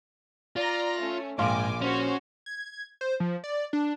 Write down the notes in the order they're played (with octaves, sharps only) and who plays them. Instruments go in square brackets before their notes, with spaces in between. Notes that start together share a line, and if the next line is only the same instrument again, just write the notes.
[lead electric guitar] F4 [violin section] D5 A#5 A#6
[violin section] A3 C#4
[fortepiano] A#1 F5 C6 [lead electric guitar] G#2 [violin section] G5 G#5 D6
[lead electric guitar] C#4 [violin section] F#4 C5 C#5
[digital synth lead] G#6
C5
F3
D5
D4